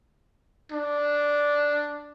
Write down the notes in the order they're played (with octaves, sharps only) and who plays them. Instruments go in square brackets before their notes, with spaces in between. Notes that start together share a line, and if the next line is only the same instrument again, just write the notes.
[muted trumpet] D4